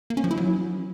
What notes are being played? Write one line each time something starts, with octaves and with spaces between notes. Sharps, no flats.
A#3
C#4
F3
E4
F#3